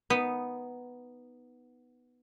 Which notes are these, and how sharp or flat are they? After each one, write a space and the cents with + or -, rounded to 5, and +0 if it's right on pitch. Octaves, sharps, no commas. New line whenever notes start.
B3 +0 D#4 +0